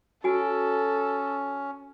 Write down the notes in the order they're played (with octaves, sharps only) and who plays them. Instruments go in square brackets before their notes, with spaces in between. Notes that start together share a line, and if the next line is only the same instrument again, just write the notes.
[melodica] C#4 [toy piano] F#4 G#5 [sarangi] A4